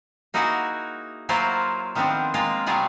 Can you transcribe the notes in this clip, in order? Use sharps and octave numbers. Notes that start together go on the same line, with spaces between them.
A#3 D#4 E4 F#4 G#4 F#5
F#3 A#3 E4 F4 C5 D5
D#3 F3 B3 C4 D4
G#3 A#3 F4
B2 F#3 G3 F4 G#4 D5